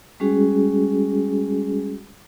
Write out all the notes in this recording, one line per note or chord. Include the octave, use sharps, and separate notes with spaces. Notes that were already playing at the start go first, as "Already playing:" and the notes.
G3 G#3 C#4 F#4 G#4